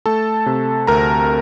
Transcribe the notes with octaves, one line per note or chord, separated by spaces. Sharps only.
A3 A4 A5
C3
D2 A#4 A#5